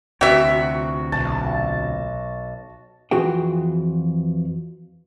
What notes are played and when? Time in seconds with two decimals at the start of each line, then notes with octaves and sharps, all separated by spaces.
0.21 D2 C3 F#4 G4 E5
1.12 B1 A5
3.11 F2 E3 F#4 G#4 G5